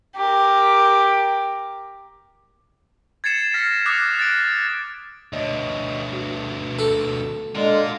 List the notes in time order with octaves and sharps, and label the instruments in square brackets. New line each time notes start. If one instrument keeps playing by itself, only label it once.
[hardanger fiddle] G4 A#4
[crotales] G#6 A6 C7 C#7 E7
F6 A#6 B6 C#7
D6 D#6 F#6 C#7
A6 D7
[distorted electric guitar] D2 B2 [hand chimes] C#5 D#5
[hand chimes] F#4
[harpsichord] A4
[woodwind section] D3 G#3 [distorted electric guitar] F4 A#4